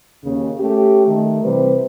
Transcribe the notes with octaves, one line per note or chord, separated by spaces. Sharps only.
D#2 C#3
A3 C#4 G4
D#3 A3
C3 E3 G3 B4 C5